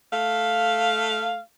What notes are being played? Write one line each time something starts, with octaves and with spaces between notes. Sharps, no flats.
A3 F5